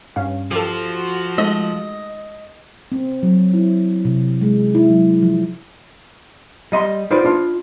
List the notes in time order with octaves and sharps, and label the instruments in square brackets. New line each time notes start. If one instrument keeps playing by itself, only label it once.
[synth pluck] G2 C#4 F5
[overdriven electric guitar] F3 [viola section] F#4 [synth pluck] G4 A4
[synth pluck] G#3 A3 [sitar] D#5
[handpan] C4
F#3
E4
C3
G#3
E4
F#3
F3
[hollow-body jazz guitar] G3 D#5 B5 C6
D#4 F4 B4 C5 D5
D4 F4